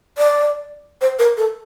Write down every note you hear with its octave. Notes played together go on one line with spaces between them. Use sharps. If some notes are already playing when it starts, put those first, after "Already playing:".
D5
C5
A#4
A4